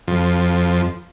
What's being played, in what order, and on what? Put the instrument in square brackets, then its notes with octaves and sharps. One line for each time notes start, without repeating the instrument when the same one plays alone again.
[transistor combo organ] F2